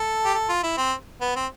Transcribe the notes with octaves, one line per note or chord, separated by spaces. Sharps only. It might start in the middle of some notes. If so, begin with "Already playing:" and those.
Already playing: A4
G4
A4
F4
E4
C4
B3
C4